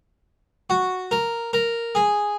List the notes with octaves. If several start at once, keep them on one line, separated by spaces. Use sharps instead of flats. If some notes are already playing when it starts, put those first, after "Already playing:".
F#4
A#4
A#4
G#4